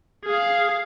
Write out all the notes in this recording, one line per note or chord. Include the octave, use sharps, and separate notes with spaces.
G#4 F5